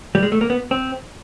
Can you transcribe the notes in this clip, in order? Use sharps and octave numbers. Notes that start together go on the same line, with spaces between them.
G3
G#3
A3
A#3
B3
C4